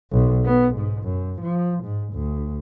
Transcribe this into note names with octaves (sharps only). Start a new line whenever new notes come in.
B1
B3
G#2
F#2
F3
G#2
D2